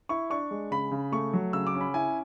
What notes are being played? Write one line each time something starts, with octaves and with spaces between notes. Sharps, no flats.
E4 C#6
D4 C#6
G#3
C#3 B5
C#3
A3 C#6
F#3
C#3 E6
D6
C#4
B5
E4 G#5